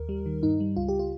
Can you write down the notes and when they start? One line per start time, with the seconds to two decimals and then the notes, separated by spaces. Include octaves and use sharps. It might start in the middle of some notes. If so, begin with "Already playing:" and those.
Already playing: D#2 A#4
0.09 G3
0.26 D#3
0.43 G2 D#4
0.60 G3
0.76 C#2 F4
0.88 G4
0.99 F4